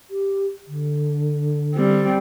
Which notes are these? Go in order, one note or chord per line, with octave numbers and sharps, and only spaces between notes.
G4
D3
G3 C4